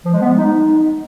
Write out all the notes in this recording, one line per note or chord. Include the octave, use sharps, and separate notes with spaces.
F3
G#3
B3
G#3
D#4